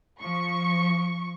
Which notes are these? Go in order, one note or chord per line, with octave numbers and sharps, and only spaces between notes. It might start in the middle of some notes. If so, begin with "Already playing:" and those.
F3 C#6